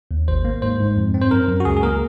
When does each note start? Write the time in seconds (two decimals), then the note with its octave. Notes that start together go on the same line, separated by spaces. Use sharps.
0.11 D#2
0.28 G#1 C5
0.45 A#3
0.62 G#2 C5
0.80 G#2
0.97 F2
1.14 C4
1.21 C5
1.31 F#2 A#4
1.48 F#2
1.60 F#4
1.65 C#2 G#4
1.77 G#4
1.83 A#3 A#4